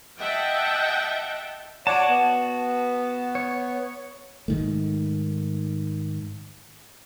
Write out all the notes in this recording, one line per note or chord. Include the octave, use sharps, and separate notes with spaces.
D#5 E5 F#5 G5 A5
F#4 C#5 D5 F#5 A5
B3
C#5
G#2 D#3 A3